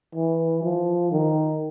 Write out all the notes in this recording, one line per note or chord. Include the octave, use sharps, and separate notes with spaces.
E3
F3
D#3